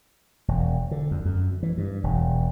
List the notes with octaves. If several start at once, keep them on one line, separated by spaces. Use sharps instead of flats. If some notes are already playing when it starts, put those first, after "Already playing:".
E1
D3
F2
F#2
E3
G2
E1